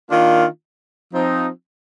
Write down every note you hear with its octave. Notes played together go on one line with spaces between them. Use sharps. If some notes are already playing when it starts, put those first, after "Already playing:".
D#3 A#3 D4 F4
F3 C4 D#4